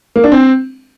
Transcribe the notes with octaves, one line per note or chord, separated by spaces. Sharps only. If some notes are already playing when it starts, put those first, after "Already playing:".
A#3
D4
C4